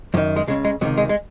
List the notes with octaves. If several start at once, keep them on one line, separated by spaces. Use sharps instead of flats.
F#2 D#3 F3
G#3
C#2 C#3 G#3
G#3
C#2 C3 D#3 F#3
G#3
G#3